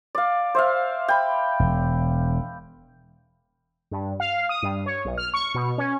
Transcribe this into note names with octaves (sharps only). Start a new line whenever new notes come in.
D5 F5
C5 E5 F5
G5 B5
E1
G2
F5
D#6
G2
C#5
B1
F6
C#6
B2
C#4